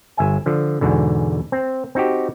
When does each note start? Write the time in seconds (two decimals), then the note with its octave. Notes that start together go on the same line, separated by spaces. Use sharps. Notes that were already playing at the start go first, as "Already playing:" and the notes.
0.17 G1 E5 G#5
0.46 D3 F3
0.81 E2 G#2 B2 D3
1.52 C4
1.95 C4 D#4 F#4 G4